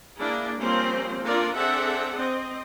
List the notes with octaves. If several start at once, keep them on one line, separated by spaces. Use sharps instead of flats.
A#3 D4 E4 G#4
F3 G3 A#3 C4 C#4 C5
A#3 D4 F4 A4 A#4 D5
C4 D4 G#4 A4 E5 F#5
C4 D#5